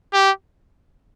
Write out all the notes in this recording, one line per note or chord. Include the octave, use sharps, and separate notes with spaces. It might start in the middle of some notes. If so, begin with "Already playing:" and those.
G4